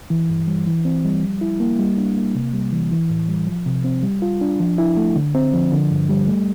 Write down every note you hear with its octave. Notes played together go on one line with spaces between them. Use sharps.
E3
G2
G3
E3
C4
G3
F3
E4
A#3
G3
D4
A#3
C3
G3
E3
E3
A2
G3
F3
C3
C4
G3
F4
D4
F3
E4
A3
D3
C4
F3
D3
G2
G3
A3